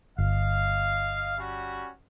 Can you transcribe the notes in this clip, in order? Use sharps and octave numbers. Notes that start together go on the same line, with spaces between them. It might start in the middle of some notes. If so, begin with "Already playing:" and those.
G1 D#5 F5
G3 C#4 F#4